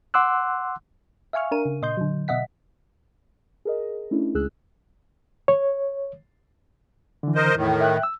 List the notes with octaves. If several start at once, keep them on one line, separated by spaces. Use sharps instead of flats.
F#5 C6 D6 E6 F#6
E5 F5 G#5 C#6 F6
D4 A#4 D#7
C#3
A#2 D#5 C6 G6
D3 F#3
B2 D#5 E5 F#5 B6
G#4 A#4 D#5
A3 C#4 D4 E4
C#2 G#3 G#4 E6 F#6
C#5
D3 E3
A#4 C5 D#5
E2 A2 D#3
E5 G5 F#6
E6